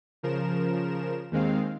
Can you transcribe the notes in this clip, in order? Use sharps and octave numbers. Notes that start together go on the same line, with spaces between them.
C#3 F3 A#4 E7
D#2 D#3 G#3 C4 F5